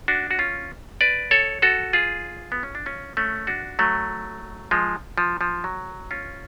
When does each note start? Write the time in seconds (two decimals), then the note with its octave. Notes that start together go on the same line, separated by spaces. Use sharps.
0.08 D4 F#4
0.31 F#4
0.39 C#4 F4
1.01 B4 D5
1.31 A4 C#5
1.62 F#4 A4
1.93 F4 G#4
2.52 B3
2.63 C#4
2.75 D4
2.86 C#4 F4
3.17 A3 C#4
3.47 D4 F#4
3.79 F#3 A3
4.71 F3 G#3
5.18 F3
5.41 F3
5.64 F#3
6.11 C#4 F4